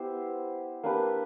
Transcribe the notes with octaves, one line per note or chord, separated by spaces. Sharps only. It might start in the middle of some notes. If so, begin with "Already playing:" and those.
Already playing: B3 E4 G4 C5
A#3 D4 G4 B4